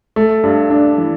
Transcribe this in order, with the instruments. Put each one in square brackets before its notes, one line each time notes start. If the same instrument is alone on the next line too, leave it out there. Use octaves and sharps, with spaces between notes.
[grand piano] A3
G2
D4
E3